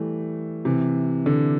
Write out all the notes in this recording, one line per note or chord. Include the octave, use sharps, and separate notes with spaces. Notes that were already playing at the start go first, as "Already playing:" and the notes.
Already playing: E3 G3 A3
C3 E3
D3